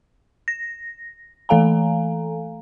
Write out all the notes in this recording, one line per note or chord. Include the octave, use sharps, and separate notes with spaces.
A#6
E3 A3 A4 F5 G#5 A#5